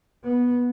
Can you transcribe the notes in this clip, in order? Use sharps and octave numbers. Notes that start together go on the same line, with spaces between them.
B3